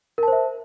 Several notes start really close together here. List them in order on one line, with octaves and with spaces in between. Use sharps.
A#4 A5 C5 E5